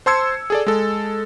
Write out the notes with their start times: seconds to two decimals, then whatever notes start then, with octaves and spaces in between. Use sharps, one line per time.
0.06 C5 A5 C6 E6 G#6 C#7
0.50 G#4 A4 D5
0.67 G#3 A4